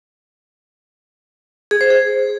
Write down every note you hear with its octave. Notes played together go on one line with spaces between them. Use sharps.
G#4
C5
G#4